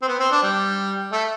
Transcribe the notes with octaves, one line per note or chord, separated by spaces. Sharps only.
C4
B3
C4
D4
G3
A3